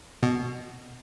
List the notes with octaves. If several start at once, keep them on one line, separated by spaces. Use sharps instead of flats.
B2